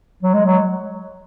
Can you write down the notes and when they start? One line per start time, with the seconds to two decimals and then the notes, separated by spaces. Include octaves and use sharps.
0.23 F#3
0.34 G#3
0.46 F#3